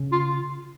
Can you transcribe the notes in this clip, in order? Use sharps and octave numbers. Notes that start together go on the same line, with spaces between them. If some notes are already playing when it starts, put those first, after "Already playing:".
Already playing: C#3
F4